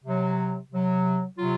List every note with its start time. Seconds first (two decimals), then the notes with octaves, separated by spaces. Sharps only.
0.04 C3 F#3
0.70 C3 F#3
1.37 C3 F#3 F4